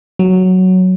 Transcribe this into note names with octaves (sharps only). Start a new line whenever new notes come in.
F#3